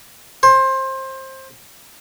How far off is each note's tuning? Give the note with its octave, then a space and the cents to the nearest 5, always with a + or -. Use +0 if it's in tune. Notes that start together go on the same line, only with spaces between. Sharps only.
C5 +20